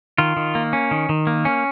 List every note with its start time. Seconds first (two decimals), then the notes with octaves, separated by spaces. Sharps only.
0.18 D#3 F4
0.37 D#3
0.55 A#3
0.73 C#4
0.91 D#3
1.09 D#3
1.27 A#3
1.45 C#4